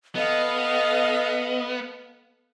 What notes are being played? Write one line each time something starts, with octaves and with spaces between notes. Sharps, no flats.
B3 A4 D#5 F5